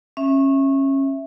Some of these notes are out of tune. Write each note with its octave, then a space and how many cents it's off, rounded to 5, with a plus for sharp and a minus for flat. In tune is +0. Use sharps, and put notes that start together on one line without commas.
C#4 -25 E5 +0